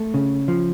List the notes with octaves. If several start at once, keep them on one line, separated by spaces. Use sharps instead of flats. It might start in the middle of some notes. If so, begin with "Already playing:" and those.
Already playing: A3
C#3
F3